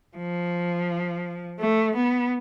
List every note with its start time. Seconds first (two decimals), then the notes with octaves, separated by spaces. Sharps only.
0.17 F3
1.60 A3
1.95 B3